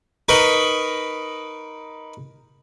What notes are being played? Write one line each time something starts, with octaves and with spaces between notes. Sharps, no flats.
D#4 A#4 B4 D#5 B5 C#6